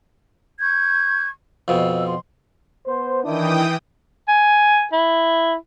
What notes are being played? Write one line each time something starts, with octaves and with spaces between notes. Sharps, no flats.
C#6 G6 G#6
F2 B2 E6
C6
B3 C5
D#3 E3 D4 E4 G5 D#6
G#5
E4